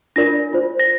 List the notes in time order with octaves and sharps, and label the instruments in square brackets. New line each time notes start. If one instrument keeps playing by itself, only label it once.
[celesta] D4 F4 A#4 D5 A#6
F4 C5
A#6